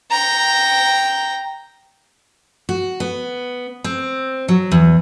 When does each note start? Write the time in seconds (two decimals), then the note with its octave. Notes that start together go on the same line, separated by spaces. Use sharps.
0.11 G5 A#5
2.69 F#4
3.00 B3
3.84 C4
4.48 F#3
4.72 E2